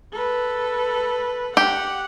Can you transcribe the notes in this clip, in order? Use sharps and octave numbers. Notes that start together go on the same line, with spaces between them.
A4 B4
G4 F#5